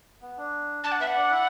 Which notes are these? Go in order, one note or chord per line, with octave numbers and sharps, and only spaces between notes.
B3
D4
D4 D5 A5
F#5
B3 B4 E5
F#5
D4 D5
E4 E5